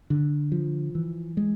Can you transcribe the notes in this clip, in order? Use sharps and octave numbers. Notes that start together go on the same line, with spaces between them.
D3
F3
E3
G#3